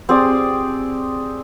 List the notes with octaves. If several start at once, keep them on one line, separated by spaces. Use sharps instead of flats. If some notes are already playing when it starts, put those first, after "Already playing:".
C4 G4 G#4 D5